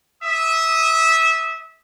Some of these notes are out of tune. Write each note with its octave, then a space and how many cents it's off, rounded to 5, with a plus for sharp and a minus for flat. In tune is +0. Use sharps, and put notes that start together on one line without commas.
E5 -15 D#6 +0